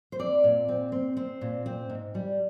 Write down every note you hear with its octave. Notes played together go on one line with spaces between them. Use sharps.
C5
C4 D5
A#2
C4
C4
C4
A#2
C4
G#2
G3